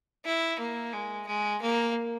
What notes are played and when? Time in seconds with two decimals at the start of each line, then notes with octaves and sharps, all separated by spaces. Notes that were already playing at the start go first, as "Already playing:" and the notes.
0.24 E4
0.59 A#3
0.93 G#3
1.26 G#3
1.61 A#3